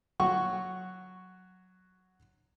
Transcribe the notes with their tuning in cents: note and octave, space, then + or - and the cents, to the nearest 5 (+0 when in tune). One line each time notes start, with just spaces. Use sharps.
F#3 +0 F#4 +0 C#6 +0